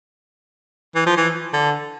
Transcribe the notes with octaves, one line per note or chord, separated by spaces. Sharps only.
E3
F3
E3
D3